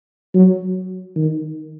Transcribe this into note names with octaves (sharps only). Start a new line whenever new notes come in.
F#3
D#3